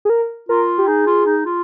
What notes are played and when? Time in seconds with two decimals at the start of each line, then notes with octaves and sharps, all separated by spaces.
0.05 G#4
0.10 A#4
0.49 F4 A#4
0.78 G4
0.87 D#4 G#4
1.06 F4
1.26 D#4
1.46 F4